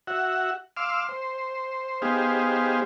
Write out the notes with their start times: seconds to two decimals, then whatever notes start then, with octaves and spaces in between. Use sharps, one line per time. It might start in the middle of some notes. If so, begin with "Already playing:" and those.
0.07 F#4 E5 F#5
0.77 F5 C6 D6 E6 F6
1.09 C5
2.02 B3 D#4 G4 G#4 C5 F5